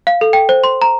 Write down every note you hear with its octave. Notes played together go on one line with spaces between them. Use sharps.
F5
A4
G5
C5
C6
A#5